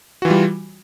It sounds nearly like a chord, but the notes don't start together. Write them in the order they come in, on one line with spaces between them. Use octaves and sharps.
F#4 E3 F4 G3